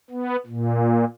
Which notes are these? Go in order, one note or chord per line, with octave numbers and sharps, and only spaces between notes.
B3
A#2